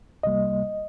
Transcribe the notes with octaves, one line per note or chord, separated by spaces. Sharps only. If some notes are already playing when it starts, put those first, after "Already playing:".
C2 C3 G3 A#3 D#5